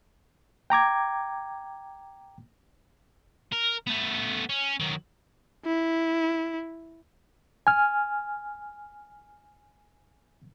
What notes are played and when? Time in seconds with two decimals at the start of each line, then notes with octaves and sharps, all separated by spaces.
0.70 G5 A#5 D6 G#6
3.52 A#4
3.87 A3 B3
4.49 C#4
4.80 D#3 F#3
5.65 E4
7.67 G#5 F6